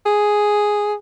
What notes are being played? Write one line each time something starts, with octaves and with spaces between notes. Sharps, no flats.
G#4